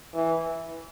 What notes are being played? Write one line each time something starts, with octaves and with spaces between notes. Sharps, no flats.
E3